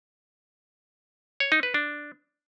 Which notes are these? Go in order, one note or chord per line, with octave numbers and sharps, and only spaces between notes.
C#5
D#4
B4
D4